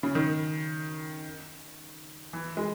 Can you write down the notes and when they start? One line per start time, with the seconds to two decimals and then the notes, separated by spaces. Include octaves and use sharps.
0.03 C#3
0.15 D#3
2.33 E3
2.57 G#3